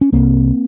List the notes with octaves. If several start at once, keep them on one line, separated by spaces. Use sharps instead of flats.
C#4
C2 A#3 C4